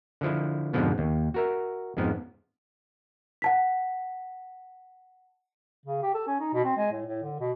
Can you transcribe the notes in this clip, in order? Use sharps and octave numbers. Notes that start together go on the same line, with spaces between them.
D3 F3 E4
F2 G#2 B2 D3 F3 B3
D#2
F#4 A#4 E5
F2 G#2 F3 B3
F#5 A5 B6
C#3
G4
A4
C#4
D#4
B2
C4
G#3
A2
A2
D3
B2